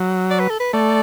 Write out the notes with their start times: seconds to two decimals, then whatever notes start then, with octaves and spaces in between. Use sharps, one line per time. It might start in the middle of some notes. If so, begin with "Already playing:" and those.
Already playing: F#3
0.31 D5
0.40 B4
0.50 A4
0.60 B4
0.73 A3 D5